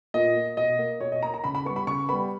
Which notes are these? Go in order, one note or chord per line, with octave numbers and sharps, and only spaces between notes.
A#2 D#5
A#3
B2 D#5
A#3
B2 C#5
D#5
A#3 A#5
A#5
C#3 B5
B5
G3 B3 C#6
B5
C#3 C#6
G3 B3 B5